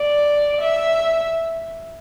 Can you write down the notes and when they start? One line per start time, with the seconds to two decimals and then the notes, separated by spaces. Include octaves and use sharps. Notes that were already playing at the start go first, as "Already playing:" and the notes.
Already playing: D5
0.61 E5